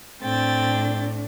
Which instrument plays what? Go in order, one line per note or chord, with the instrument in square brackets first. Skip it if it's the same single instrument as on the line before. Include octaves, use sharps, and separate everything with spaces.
[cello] A2 D4 [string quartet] C4 G5 A6